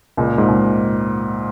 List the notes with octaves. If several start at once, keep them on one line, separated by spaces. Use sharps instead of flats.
C#2 A#2
G#2
C#2